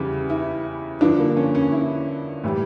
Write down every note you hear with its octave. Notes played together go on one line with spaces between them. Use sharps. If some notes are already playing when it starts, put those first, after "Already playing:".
Already playing: E2 C#3 G3 E4
E4
G2 D3 F3 D4
A#3
C#4
C#4
E4
A2 E3 G3